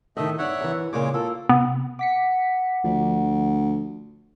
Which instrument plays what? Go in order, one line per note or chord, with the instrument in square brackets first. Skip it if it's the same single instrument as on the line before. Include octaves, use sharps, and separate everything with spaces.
[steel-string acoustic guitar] A2 D#3 [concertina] A3 D#5 E5
[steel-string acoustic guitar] G2 D5 [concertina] C#5 E5 F#5
[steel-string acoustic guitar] F#2 E3
[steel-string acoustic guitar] A#2 C#3 A#3 [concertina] G#3 C#5 D6
[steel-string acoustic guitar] A#3 F4 [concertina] A4
[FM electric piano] C3 [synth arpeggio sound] B3
[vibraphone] F#5 [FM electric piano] D6 B6 C#7
[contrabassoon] D2 [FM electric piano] F3 D4